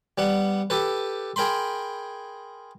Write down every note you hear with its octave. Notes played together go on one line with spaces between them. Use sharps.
G3 B3 F#5
G4 A4 B4
G#4 A#4 G5 B5 C6